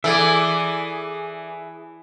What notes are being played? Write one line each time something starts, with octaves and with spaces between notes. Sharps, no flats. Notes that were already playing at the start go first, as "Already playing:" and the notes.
E3 G#4 A4 D5 E5 G#5